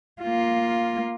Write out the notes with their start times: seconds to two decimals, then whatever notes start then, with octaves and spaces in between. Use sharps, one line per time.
0.22 A#3 F4